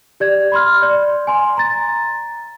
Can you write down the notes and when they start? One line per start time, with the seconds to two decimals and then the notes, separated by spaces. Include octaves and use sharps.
0.20 G4 D5 G#6
0.52 B5 C6 F6
0.82 D5
1.27 G#5 C6
1.57 A#5 A6